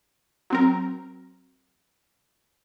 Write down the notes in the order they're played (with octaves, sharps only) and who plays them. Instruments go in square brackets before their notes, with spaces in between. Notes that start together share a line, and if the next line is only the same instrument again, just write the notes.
[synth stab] F#3 C4 A#4